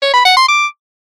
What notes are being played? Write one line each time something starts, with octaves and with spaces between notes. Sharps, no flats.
C#5
B5
F#5
C6
D6